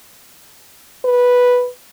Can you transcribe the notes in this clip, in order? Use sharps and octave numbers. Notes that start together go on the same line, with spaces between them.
B4